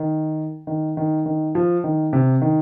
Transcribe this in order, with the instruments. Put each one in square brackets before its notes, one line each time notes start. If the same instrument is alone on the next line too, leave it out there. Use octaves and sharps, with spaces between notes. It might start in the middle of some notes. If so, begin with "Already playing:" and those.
Already playing: [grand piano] D#3
D#3
D#3
D#3
F3
D#3
C3
D#3